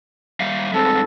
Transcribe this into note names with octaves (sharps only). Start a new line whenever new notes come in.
G3 E5 F5
G2 G#3 C4 A4